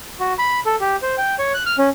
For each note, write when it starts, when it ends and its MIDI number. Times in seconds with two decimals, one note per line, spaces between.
0.20 0.34 66
0.38 0.60 83
0.66 0.76 69
0.80 0.96 67
1.02 1.15 72
1.18 1.35 79
1.39 1.52 73
1.54 1.63 90
1.66 1.76 89
1.78 1.89 61